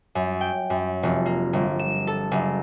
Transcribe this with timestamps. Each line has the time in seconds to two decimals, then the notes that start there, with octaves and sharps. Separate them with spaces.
0.15 F#2
0.41 G5
0.70 F#2
1.03 F1
1.26 A#3
1.53 G1
1.79 E7
2.07 A4
2.31 F#1